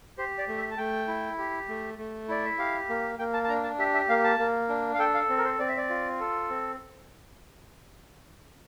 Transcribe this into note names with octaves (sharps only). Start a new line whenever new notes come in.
G4 C5
D5
A3
E5
A5
A3 G5
E4
G4
A3
A3
E4 D5
E5
G4 F5
A#3
A#3 G5
A5
A5
D4 A#5
A5
G4 E5
E5
A#3 F5
A5
A#3
D4
F5
A4 G5
F5
C4
A#4
C5
C4 D5
E5
D5
F4
A4
C4